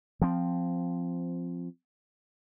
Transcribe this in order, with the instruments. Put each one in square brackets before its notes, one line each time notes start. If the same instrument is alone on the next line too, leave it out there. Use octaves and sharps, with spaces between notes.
[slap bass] F3 C4